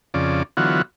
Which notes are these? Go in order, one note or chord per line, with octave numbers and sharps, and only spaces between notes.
F2 C#3 D5
D3 E3 F#3 B3 F4 F#4